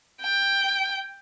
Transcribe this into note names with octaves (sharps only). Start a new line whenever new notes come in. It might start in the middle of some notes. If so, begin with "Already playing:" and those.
G5